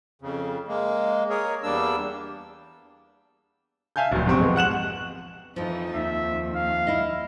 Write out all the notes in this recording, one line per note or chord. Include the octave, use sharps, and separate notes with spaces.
F2 C#3
G#3 A#3
G#4 A#4 C#5
E2 G3 A#3 D4 E6
E5 F5 G#5 A5 G6
D1 A#1
G#2 C3 C4 C#6
F2 G#3 B3
F#5 F#6 E7 F#7
F2 E3 F3 D#4
D#2 E5
F5
E4 D#5